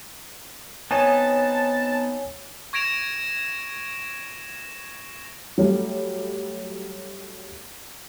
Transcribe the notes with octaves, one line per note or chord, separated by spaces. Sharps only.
B3 C4 D#4 C#5 G#5 A5
C#6 G#6 A#6 D7 E7 F7
F#3 G3 A3